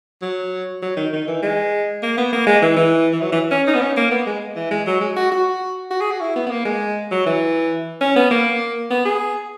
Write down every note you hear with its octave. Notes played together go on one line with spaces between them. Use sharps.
F#3
F#3
D#3
D#3
E3
G#3
A#3
B3
A#3
G#3
E3
E3
E3
F#3
E3
C#4
D#4
B3
C#4
A#3
B3
G#3
E3
G#3
F#3
G#3
F#4
F#4
F#4
G#4
F#4
E4
B3
B3
A#3
G#3
F#3
E3
C#4
B3
A#3
B3
G#4